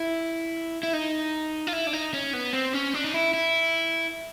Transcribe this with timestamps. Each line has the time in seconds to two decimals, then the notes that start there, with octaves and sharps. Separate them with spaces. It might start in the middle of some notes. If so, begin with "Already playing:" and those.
Already playing: E4
0.83 E4
0.93 D#4
1.67 F4
1.73 E4
1.87 D4
1.93 D#4
2.14 C#4
2.34 B3
2.54 C4
2.74 C#4
2.94 D4
3.04 D#4
3.14 E4
3.33 E4